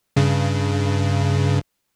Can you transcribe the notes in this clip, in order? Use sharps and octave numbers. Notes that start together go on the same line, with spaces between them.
G2 C#3